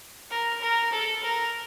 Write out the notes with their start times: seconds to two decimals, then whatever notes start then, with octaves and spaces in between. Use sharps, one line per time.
0.30 A#4
0.62 A#4
0.93 A4
1.23 A#4